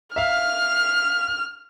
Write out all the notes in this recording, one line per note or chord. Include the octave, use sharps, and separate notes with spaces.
E5 F5 F6